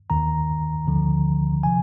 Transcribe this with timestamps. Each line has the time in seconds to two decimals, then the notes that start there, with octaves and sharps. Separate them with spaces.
0.10 D#2 D#3 A#5
0.87 D2 D3 F3
1.63 C3 F3 G#5